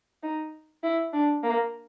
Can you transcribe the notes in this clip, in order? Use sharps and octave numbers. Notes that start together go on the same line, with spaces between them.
D#4
E4
D4
A#3